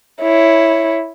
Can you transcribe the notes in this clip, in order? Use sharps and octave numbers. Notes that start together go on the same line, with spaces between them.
E4 C#5